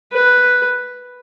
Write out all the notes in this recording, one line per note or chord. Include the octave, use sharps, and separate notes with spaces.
B4